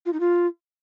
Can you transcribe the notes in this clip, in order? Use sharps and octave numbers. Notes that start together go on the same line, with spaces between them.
F4
D#4
F4